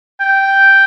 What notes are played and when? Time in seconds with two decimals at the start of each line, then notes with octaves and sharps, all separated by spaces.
0.20 G5